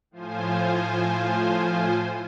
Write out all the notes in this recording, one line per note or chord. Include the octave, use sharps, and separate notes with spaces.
A2 F3 F4 C5 G#5